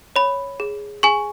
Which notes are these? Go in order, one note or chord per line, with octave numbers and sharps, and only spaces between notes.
C#5 B5
G#4
G#4 G#5 C#6